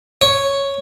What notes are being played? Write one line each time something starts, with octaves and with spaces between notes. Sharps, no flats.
C#5